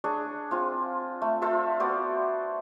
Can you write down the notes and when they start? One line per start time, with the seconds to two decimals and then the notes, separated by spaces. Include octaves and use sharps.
0.04 D4 G#4 C#5
0.51 C4 F4
1.22 A3
1.42 F4 A4 C5 E5
1.80 B3 F#4 C5 D5